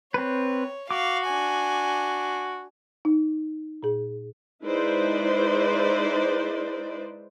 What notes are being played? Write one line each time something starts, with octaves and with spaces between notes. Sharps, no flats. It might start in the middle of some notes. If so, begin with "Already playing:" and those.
C4 B4 C#5
F#4 F5 D6
D4 G#5
D#4
A#2 G#4
G#3 D#4 E4 B4 C5 D5